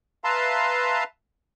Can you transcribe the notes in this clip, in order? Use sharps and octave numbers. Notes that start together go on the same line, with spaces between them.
B4 E5 F5 A5 A#5 C6